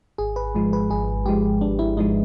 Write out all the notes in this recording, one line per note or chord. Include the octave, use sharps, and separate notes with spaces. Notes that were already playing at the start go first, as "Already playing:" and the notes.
G#1 G#4
B4
G#2 F3 G#3
B4
G#1 G#4
G#2 F3 G#3 G4
G#1 D4
E4
G#2 F3 G#3 D#4